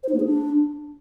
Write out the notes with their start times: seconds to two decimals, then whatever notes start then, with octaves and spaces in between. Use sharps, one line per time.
0.03 C5
0.09 D#4
0.14 A#3
0.20 G#4
0.25 D4